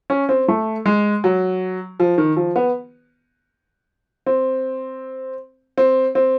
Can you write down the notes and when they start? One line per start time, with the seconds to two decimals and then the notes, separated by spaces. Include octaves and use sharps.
0.10 C#4
0.29 C4
0.48 A3
0.86 G#3
1.24 F#3
2.00 F3
2.18 D#3
2.37 F3
2.56 B3
4.26 C4
5.78 C4
6.15 C4